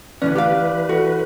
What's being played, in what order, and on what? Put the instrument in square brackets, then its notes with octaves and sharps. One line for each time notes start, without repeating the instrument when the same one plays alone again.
[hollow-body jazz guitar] D2 D3 C#4 [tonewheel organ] E3 B4 [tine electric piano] D5
[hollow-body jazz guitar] G4 F5
[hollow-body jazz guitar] F#4 [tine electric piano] A4